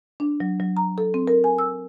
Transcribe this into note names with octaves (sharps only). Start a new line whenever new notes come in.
D4
F#3
F#3
A#5
A4
C4
A#4
G#5
E6